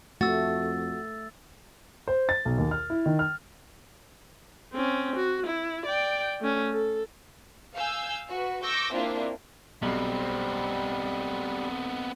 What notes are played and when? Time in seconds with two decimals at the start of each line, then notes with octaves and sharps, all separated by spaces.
0.21 F2 A3 F#4 E6 A6
2.08 C5
2.29 A6
2.45 B1
2.58 D#2
2.71 F6
2.90 E4
3.06 D#3
3.19 F6
4.73 C4 C#4
5.16 F#4
5.46 E4
5.86 D5 G5
6.40 A3 C#4
6.73 A4
7.76 F5 G#5 E6 G6
8.29 F#4 B4
8.63 C#6 D6 E6 G6 A#6
8.92 A#3 C4 D4 E4 F4
9.82 B1 G3 B3 C4